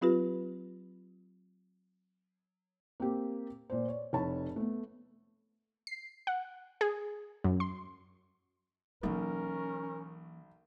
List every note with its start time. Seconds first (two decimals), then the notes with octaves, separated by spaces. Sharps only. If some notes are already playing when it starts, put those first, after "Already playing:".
0.01 F#3 C4 F4 G4 B4
3.00 A#3 C4 G4
3.70 A#2 C5
3.88 C#5 D5
4.13 F1 C#5 A5 B5
4.56 A3 B3
5.87 C7
6.27 F#5
6.81 G#4
7.44 F#2
7.60 C6
9.03 B1 E3 A#3 C#4 A#4